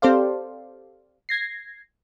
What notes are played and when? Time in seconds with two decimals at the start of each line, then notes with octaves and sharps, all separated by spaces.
0.02 C4 G4 A4 C5 D5 F5
1.29 G#6 A#6 C7